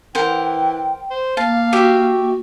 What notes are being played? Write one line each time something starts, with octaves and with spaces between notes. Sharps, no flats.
E3 A#4 C5 F#5 G5
C5
A#3 F5 A5
F#4 G4 E5